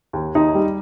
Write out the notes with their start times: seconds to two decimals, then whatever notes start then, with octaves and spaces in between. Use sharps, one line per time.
0.13 D#2
0.35 D#2 D#4
0.55 G3